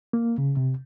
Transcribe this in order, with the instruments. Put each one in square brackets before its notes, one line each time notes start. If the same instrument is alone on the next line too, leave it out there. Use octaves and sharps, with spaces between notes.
[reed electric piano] A#3
C#3
C3